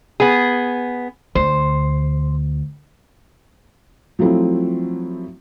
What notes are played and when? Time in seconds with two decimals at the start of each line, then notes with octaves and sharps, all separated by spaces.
0.20 B3 G#4
1.35 D2 C5
4.19 F3 F#3 A3 C4 E4